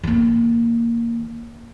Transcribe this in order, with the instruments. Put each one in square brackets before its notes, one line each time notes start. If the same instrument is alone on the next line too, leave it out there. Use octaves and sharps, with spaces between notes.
[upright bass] D#3 A#3